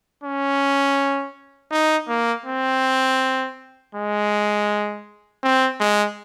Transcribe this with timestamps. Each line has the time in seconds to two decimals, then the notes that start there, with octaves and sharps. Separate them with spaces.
0.23 C#4
1.71 D#4
2.08 A#3
2.45 C4
3.95 G#3
5.43 C4
5.80 G#3